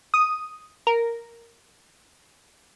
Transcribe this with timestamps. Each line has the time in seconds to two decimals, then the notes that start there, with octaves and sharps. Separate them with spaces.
0.14 D#6
0.87 A#4